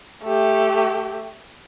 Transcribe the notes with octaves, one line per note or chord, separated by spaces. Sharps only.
A3 G4